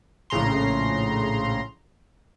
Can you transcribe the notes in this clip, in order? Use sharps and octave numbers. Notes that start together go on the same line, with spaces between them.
A#1 A2 C#3 A#5 C6